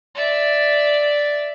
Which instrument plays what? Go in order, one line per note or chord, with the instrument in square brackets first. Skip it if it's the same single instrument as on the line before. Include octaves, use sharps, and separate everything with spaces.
[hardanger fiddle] D5 E5